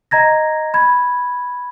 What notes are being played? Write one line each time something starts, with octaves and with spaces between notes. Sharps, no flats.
D#5 A#5 G#6 A#6
B5 G#6